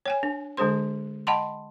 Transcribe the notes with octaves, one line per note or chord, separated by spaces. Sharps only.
C#5 G5 G#5
D4
D3 G#3 D4 G#4 C5 C6
D#5 F#5 G5 A5 B5 C6